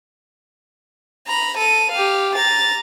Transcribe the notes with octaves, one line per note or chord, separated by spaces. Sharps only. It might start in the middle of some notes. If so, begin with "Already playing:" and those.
A#5 B5
A4 D#7
G4 F5
A#5 A6